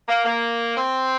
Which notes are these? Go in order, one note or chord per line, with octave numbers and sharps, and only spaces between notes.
A#3
A#3
C4